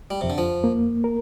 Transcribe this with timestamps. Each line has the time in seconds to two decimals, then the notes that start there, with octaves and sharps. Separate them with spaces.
0.10 G3
0.21 F2 C3
0.30 D3
0.38 F3
0.64 A#3
1.04 A#4